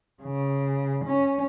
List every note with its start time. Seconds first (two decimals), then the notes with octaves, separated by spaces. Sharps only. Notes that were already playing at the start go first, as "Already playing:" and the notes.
0.22 C#3
1.05 C#4